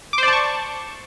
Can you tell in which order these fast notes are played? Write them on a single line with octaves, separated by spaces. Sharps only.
D6 C5 D5 A5 C#6